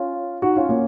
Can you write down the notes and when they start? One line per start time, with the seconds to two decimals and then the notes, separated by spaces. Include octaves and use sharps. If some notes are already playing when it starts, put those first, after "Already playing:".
Already playing: C#4 F4
0.42 D#4 F#4
0.57 C#4 F4
0.69 A#3 C#4